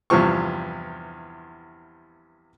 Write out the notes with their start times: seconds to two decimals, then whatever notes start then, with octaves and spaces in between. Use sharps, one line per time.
0.10 E2 G2 C3 F3 C#6